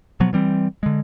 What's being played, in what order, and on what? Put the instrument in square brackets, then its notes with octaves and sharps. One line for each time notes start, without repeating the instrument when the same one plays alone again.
[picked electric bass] B2 F3 F#3 B3
E3 G3 C4
D3 G#3